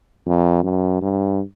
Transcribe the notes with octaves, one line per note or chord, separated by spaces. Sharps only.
F2
F#2
G2